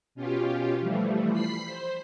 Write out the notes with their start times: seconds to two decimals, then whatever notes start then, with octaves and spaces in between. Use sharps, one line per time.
0.15 B2 C#4 F4 G4
0.79 E3 F3 G3 A3
1.32 B5 B6 C7
1.65 C5